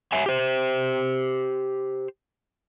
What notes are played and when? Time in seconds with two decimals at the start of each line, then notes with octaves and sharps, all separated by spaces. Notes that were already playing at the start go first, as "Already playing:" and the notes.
0.12 C#5 E5 G#5
0.26 G4 C5